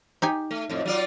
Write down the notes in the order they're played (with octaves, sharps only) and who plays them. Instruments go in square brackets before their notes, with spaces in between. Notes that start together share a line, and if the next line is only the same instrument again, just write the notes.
[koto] D#4 G4 G#5
[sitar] A3
F2 A2
F#3 F4 D5